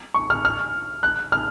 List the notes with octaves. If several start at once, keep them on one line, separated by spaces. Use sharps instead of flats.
C#6
F6
F6
F#6
F6